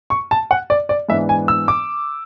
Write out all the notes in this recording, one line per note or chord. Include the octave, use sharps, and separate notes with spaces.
C#6
A5
F#5
D5
D5
G#2 E3 B3 D4 E5
G#5
E6
D6